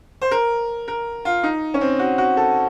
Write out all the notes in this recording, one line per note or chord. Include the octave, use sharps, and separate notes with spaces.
C5
A#4
A#4
F4
D#4
C#4
C4
F#4
F#4
A4